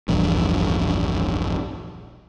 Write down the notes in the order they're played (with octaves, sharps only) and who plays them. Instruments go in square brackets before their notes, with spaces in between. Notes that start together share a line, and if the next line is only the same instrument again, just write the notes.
[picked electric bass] D1 A#1 E2 G2